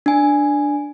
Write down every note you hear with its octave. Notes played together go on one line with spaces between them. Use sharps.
D4 G#5